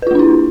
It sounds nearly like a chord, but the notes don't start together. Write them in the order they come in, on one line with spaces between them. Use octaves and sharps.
B4 F4 A#3 D4 E4